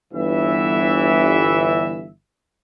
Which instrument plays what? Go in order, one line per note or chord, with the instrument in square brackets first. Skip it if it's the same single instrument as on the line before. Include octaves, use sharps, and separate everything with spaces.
[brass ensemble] G1 E3 E5